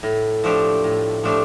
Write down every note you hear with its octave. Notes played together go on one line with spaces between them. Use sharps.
A2
F3 A3 D4 G4
A2
F3 A3 D4 G4